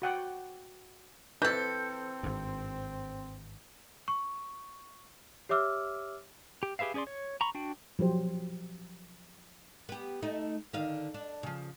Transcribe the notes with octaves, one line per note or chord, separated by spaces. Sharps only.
F#4 F#5 G5
E3 C4 A4 G6
G#1 G2
C#6
G4 C#5 E5 D6 E6 F6
G4
G4 G#4 B4 E5 F5
C#4 G#4 C#5 D5 C6
C#5
A#5 B5 C#6
D4 F#4 G5
F3 F#3 G4 C5
B3 G4
A3 D#4
D3 D#3 F5
D4
C#3 F3